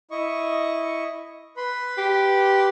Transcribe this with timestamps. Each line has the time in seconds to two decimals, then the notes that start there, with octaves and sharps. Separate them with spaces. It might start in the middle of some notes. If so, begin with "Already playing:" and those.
0.11 E4 D#5 C#6
1.57 B4 B5 C6
1.98 G4